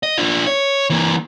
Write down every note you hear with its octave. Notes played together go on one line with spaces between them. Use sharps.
D#5
D4 F4
C#5
E3 A#3